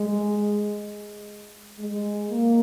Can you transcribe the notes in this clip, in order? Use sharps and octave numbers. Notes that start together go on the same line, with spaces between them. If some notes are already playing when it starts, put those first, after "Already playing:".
Already playing: G#3
G#3
A#3